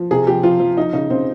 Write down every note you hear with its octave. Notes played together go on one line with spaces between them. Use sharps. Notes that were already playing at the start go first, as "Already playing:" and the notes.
Already playing: F3
C3 G#4
F3 G4
F3 F4
F3
F3 D#4
C#3 D#4
C#3 C4